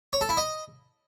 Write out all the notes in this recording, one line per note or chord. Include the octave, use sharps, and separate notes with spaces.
C#5
A4
E4
D#5